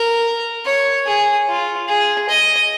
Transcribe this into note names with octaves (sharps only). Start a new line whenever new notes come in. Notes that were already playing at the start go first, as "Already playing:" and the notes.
Already playing: A#4
C#5
G#4
F4
G#4
D#5